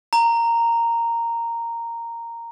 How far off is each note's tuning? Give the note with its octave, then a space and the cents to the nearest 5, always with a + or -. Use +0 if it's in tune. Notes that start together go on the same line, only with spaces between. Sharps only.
A#5 -10